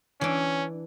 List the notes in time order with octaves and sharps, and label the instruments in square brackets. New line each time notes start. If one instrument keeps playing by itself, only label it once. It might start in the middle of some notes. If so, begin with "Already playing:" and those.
[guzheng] E3 D4 [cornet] C#4